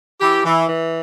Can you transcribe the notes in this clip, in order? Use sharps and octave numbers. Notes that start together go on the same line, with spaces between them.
E3 G4
E3
E3